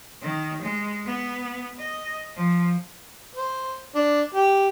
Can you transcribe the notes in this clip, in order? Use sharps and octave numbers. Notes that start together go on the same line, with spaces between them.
D#3
G#3
B3
D#5
F3
C5
D4
G4